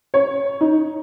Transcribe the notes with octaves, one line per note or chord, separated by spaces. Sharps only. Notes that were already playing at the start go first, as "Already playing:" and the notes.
C#5
D#4